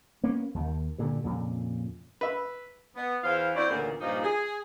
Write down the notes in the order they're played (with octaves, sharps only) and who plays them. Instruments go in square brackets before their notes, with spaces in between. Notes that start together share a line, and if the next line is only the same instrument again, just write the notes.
[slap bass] A#3 B3 C#4
D#2 D#3
G2 A#2 D3
F2 A#2 C#3
[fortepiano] B4 E5
[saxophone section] B3
E2 E3 C5 F5
C4 E4 F#4 C5 D5
D2 A#2 C#3 E3 A#3 B3
G2 A#2 F3 A#3 D#4
G#4